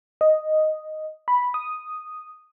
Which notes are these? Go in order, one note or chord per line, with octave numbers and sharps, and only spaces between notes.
D#5
B5
D#6